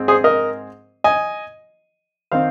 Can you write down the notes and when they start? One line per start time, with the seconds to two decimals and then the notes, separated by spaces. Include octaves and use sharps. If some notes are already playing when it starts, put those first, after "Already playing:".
Already playing: G#2 G#3 C4
0.08 G#4 C5
0.24 A#4 D#5
1.04 D#5 G#5
2.32 D#3 C4 C5 F5